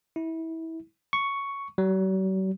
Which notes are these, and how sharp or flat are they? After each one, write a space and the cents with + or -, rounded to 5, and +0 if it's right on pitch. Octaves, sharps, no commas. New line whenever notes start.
E4 -25
C#6 +5
F#3 +45